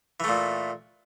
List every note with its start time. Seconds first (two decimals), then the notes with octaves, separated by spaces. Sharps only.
0.20 E3
0.24 A3
0.28 A#2